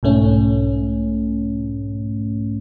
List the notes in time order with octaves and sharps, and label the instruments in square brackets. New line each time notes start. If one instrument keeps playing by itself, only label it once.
[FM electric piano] B1 G#2 A3 C#4